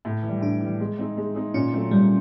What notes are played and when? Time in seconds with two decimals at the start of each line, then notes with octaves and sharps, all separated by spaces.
0.05 A2
0.23 E3
0.28 G3
0.41 A2 D4
0.60 E3 G3
0.80 G#3
0.98 C4 D#4 G#4
1.17 G#3
1.35 C4 D#4 G#4
1.54 A#2 C#4
1.73 F#3 A3 C4
1.91 A#2 G3